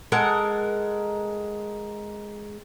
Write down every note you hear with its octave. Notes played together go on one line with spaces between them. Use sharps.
G#3 A4 A#4 F#5